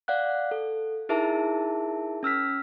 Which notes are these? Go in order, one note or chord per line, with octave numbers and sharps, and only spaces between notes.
D5 F5 F#5 F#6
A4
D#4 E4 G#4 A#4 E5 A5
C#4 E6 F6 B6